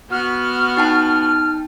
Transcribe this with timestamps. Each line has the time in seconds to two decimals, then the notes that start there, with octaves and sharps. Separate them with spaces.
0.11 B3 F#4 F6
0.77 D#4 G5 A5